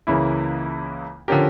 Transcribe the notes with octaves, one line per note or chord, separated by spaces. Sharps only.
C#2 C#3 E3 A#3 E4
D3 F3 C#4 G4 A#4